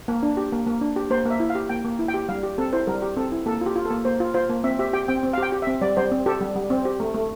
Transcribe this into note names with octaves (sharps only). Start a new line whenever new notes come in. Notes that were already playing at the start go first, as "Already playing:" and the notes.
A#3
D4
G4
A#3
A#3
D4
G4
A#3 C5
A#3
E5
E4
F5
G4
A#3 G5
A#3
E4
G5
G4
G3 F5
G4
C4 A4
E4 C5
G3 A#4
G4
C4 A4
E4
A#3 A4
F4 G4
F4
A4
A#3
A#3 C5
F4
F4 C5
A#3
C4 E5
G4 E5
G4 G5
C4 G5
C4
F5
G4 G5
G4
C4 E5
G3 D5
G3 C5
C4
G4 A4
G3
G3
C4
G4
A3
A3